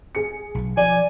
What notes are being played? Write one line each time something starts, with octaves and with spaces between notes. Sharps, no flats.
G#4 C#7
B1
F3 D5 G#5